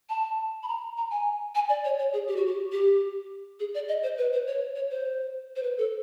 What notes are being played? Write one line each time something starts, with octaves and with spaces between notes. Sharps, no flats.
A5
B5
A#5
A#5
G#5
G#5
D5
C#5
C#5
G#4
G4
F#4
G4
G4
G#4
D5
D#5
C5
B4
C5
C#5
C#5
C5
C5
B4
A4